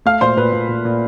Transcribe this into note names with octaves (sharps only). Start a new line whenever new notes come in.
A3 F5 F6
A#2 C5 C6
A#2 B4 B5
A#2
A#2
A#2